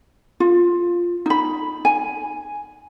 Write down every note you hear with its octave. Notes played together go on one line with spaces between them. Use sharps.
F4
D#4 B5
G#5